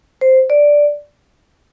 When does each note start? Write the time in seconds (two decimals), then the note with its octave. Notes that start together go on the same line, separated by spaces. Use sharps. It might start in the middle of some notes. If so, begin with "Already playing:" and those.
0.21 C5
0.50 D5